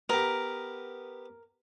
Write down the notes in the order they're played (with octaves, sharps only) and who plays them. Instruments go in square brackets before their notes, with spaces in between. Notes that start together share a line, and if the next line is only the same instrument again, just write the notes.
[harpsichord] B3 G4 [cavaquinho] A#4